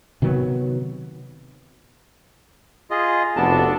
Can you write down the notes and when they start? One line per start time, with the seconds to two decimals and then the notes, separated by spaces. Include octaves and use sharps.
0.22 C3 D#3 F#3 B3
2.91 F4 G#4 D#5
3.36 F1 B3 D4 F#4 A4 A5